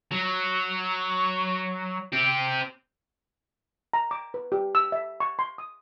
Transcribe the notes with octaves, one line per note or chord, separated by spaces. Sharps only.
F#3
C4 G4
A#5
D6
B4
G4
E6
E5
C#6
C6
D#6